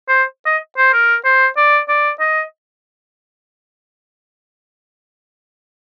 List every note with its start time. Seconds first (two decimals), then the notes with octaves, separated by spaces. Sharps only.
0.09 C5
0.46 D#5
0.77 C5
0.93 A#4
1.25 C5
1.57 D5
1.89 D5
2.20 D#5